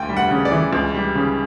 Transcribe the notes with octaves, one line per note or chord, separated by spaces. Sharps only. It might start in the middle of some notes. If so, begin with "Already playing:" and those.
Already playing: D2 G5
G3
F#5
C#3
D5
E3
C#2
G3
C#3